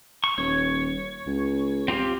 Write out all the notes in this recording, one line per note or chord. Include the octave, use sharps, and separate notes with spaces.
C#6
D#1 C#5
C#2
C4 F4 G4